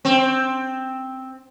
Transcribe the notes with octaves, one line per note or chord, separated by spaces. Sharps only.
C4